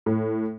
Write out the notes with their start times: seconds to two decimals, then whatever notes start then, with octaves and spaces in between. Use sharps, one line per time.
0.06 A2